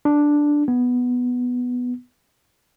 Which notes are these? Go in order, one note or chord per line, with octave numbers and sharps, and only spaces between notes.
D4
B3